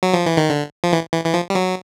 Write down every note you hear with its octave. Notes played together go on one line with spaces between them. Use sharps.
F#3
F3
E3
D#3
D3
F3
E3
E3
E3
F3
G3
F#3